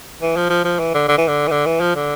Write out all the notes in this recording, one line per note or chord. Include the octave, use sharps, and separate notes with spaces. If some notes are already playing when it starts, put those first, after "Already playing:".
E3
F3
F3
F3
E3
D3
D3
E3
D3
E3
D3
E3
F3
D3